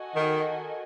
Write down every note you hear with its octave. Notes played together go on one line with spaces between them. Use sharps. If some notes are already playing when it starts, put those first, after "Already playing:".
Already playing: F#4 A4 D#5 G#5
D#3